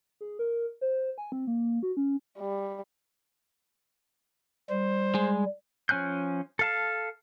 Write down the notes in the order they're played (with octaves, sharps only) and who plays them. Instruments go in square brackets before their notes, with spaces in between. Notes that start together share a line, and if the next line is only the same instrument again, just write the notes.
[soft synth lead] G#4
A#4
C5
G#5
C4
A#3
F#4
C#4
[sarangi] G3
[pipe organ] G3 [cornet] C5
[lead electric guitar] G#3
[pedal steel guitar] F3 C#4 G#5 F#6 G6
A4 F5 A5